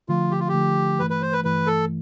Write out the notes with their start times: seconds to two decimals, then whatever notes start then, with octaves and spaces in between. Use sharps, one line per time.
0.09 D3 F3 A3 F4
0.31 G4
0.40 F4
0.48 G4
0.54 D3 F3 A3
0.99 G2 E3 A3 B4
1.10 B4
1.22 C5
1.33 B4
1.45 G2 E3 A3 B4
1.67 A4